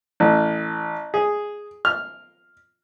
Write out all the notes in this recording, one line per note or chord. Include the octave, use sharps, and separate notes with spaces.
A1
G#4
F6